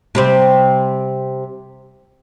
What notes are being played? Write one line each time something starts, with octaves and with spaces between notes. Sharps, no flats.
C3 G3 C4